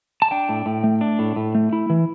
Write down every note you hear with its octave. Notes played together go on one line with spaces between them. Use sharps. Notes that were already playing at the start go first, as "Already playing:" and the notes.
A5
D4 G5
A2
A2
A3
D4
A2
A2
A3
E4
E3